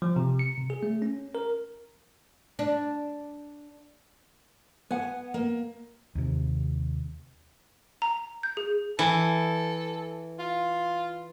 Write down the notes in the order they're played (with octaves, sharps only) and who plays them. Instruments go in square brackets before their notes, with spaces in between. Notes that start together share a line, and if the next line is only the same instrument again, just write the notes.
[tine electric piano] F3
C3
C#7
C3
G#4
A3
C#4
A#4
[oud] D4
[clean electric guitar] B3 F#5 [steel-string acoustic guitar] G#5
[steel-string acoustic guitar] A#3
[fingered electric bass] D#2 C3
[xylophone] A#5
G6
G#4
[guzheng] E3 [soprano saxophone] A4
[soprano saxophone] F4